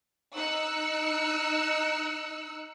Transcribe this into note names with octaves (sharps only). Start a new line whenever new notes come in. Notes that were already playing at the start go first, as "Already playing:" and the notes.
D#4 E6 F#6 C#7